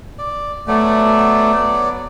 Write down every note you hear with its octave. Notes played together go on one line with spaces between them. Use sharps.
D5
F#3 A3 B3 D5